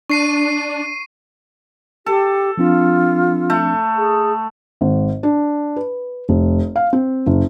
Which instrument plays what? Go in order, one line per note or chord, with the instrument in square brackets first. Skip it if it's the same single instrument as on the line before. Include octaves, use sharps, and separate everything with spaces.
[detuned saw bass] D4 [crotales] C#6 C7 D#7
[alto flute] G4 [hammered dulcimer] A4
[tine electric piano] F3 C4 D4 [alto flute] F4
[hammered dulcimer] A3
[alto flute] G#4
[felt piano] G#1
D4
B4
F1
F5
C4
F#1